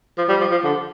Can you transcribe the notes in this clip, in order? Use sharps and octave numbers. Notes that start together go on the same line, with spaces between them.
F3
G3
F3
F3
D3